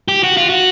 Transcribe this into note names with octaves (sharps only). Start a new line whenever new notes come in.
G4
F#4
F4
F#4